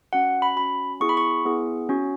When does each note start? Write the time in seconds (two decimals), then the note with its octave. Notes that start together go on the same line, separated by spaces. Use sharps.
0.13 C#4 F#4 F#5
0.42 B5
0.56 C#4 F#4 B5
1.00 B3 E4 G#4 C#6
1.09 B5
1.17 C#6
1.45 B3 E4 G#4
1.89 C#4 F#4